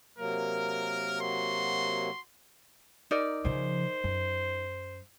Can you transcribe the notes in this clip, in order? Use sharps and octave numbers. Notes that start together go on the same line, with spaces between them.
C3 F#3 A#3 A#4
F#4 C6
D#4 A#4 D5
C#3 F3 C5
F#2